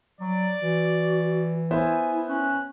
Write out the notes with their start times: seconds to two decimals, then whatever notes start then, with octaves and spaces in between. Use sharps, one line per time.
0.21 F#3 D5
0.62 E3 F#4
1.71 B3 E4 C5 E5 G#5
2.29 C#4 F#6